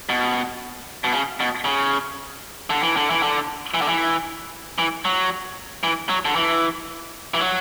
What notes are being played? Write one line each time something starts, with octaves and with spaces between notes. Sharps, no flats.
B2
B2
C#3
B2
C#3
D3
E3
D3
E3
D3
E3
D3
E3
E3
F#3
E3
F#3
D3
E3
E3
F#3